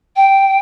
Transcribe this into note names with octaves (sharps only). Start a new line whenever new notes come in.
G5